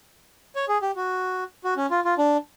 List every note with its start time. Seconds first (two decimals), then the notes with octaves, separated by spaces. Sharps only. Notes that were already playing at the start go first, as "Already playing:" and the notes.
0.56 C#5
0.68 G#4
0.82 G4
0.96 F#4
1.64 F#4
1.77 C#4
1.91 F4
2.05 F4
2.18 D4